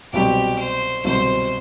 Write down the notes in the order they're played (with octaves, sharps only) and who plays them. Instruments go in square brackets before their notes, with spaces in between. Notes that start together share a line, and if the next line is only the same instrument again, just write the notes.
[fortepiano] C2 B2 F#3 C4 [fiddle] G4
[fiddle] C5
[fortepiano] C2 B2 F#3 C4 [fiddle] C5